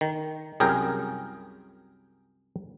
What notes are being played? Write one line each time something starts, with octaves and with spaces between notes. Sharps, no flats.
D#3
C2 F#2 G#4 A#4 G5